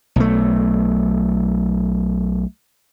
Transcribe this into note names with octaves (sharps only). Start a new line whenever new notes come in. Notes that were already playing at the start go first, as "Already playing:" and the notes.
B1 A3